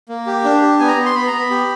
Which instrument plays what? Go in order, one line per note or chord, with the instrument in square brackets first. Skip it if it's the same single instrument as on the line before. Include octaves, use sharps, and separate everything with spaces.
[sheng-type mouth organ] A#3
G4
D4
G4
B3 G#5
A#5
B3
C6
B3 B5
A#5
B3
B5
G4